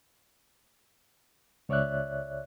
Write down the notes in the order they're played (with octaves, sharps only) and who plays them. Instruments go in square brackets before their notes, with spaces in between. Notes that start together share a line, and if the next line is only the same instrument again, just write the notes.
[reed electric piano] C#2 C#5 D5 E5 F#6